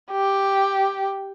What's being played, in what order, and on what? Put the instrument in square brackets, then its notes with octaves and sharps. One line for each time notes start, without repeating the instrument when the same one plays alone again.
[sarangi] G4